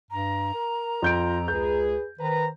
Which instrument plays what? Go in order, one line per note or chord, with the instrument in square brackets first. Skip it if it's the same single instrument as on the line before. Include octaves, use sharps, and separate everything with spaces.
[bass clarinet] G2 [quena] A#5
[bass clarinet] A#4
[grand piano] F2 G6 D7 [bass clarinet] F4
[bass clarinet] C#2 [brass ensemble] G#4 B4 [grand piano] G6
[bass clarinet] D#3 [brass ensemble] B4 C5 A#5